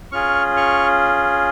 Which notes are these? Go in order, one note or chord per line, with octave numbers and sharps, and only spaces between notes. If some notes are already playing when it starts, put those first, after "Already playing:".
C#4 F4 G#4 C#6 F6
C#6 F6